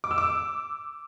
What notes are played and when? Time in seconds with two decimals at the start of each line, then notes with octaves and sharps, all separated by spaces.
0.04 D6
0.11 E6
0.18 D6